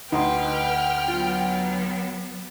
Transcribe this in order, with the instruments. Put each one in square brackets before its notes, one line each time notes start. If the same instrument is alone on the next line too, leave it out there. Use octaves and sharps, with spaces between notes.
[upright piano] D2 [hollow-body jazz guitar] D#4 C6 [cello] B4 [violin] G5 F6
[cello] F#3 B3 [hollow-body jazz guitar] F4